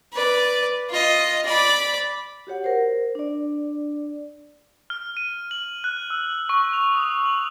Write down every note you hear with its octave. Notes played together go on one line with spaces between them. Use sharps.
B4 D5
F4 D#5
D5 B5
F#4 G4 C#5 F#5
A#4 C5
D4 D5
F6
D#7
F#7
F#6
E6
C#6
F7
D#6
F#7